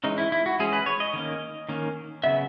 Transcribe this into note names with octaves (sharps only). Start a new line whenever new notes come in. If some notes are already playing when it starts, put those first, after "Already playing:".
E3 G#3 C#4 D#4
E4
E4
F#4
E3 G#3 C#4 G#4
B4
C#5
D#5
D#3 A#3 C#4
D#3 A#3 C#4
C#3 F#3 B3 E5